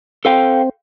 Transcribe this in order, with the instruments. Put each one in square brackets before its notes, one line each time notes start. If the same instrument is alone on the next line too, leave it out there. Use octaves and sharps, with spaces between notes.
[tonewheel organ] C4 [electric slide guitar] A4 F5 G5